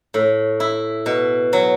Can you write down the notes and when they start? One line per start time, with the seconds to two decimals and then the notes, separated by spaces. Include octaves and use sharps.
0.14 A2
0.60 E4
1.06 B2
1.53 F#3